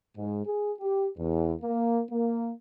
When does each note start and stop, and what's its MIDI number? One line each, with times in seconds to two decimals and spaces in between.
0.16 0.43 44
0.45 0.72 68
0.79 1.07 67
1.18 1.54 40
1.62 2.00 58
2.09 2.51 58